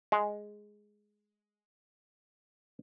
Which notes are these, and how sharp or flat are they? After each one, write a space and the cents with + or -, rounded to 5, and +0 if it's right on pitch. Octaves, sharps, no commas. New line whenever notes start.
G#3 +5